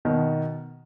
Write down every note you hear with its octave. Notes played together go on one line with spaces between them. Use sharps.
B2 D#3